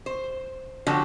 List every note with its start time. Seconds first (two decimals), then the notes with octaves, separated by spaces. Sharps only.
0.06 C5
0.87 D3 F3 F#3 G4